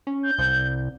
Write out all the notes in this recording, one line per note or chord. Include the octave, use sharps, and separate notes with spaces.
C#4
G6
C2